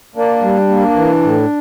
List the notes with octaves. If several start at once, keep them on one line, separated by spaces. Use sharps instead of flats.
A#3 D4
G3
A#3
E3
A2